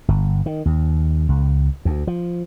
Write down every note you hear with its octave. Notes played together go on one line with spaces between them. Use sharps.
G1
D#3
D#2
C#2
D2
F3